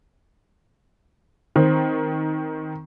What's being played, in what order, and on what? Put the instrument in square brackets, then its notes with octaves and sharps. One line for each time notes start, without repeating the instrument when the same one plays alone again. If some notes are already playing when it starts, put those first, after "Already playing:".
[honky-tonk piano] D#3 C4